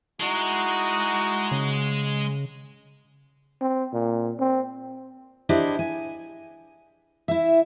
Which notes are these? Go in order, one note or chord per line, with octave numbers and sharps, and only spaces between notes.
G#3 D#4 E4 F#4
C#3
C4
A#2
C4
D4 E4 G4 C5 D5 D#5
G#5
E4 E5